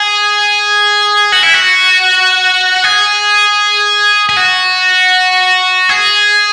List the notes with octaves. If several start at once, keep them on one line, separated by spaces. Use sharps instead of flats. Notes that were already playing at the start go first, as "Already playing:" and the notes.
Already playing: G#4
F#4
E4
F#4
G#4
G#4
F#4
G#4